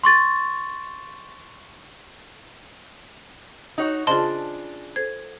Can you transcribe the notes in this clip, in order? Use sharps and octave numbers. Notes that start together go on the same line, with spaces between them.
C6 C#6 A6
D#4 F#4 C#5
C#3 D4 F4 G#4 C5 D#5 A5 C6
A4 C5 G#6